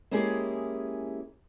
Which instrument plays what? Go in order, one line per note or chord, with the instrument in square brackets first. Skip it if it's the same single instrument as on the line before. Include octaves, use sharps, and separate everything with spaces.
[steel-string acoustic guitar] G#3 A#3 C#4 E4 G4 G#4